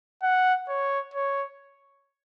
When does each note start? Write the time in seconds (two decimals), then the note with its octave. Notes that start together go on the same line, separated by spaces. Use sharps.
0.23 F#5
0.69 C#5
1.14 C#5